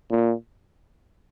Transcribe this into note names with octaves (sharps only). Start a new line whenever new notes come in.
A#2